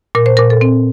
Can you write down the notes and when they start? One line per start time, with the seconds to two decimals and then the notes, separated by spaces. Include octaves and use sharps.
0.15 A#2 A#4
0.26 C5
0.37 A#2 A#4
0.50 A4
0.61 C4